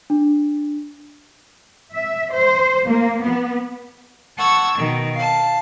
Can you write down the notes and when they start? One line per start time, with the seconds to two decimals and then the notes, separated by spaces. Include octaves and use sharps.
0.10 D4
1.94 E5
2.32 C5
2.89 A#3
3.21 B3
4.37 F#5 A5 C#6 E6 G#6
4.77 B2 D#3
5.14 F5 A5